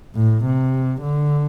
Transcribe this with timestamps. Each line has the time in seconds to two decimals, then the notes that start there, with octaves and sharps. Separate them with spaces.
0.16 A2
0.45 C3
1.02 D3